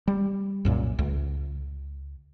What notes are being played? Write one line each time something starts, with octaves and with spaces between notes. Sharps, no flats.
G3
C2 F#2 A#2
C#2